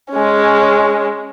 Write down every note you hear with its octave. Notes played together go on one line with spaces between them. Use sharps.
G#3 C#4